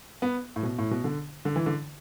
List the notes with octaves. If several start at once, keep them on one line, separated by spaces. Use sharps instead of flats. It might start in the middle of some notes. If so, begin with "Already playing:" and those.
B3
A2
B2
A2
B2
D3
D3
E3
D3